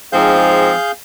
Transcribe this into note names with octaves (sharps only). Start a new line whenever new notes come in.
G#2 F3 C4 G#4 F5 G6